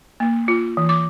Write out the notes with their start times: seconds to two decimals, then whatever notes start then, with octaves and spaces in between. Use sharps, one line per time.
0.20 A#3
0.48 F4
0.77 E3
0.89 D6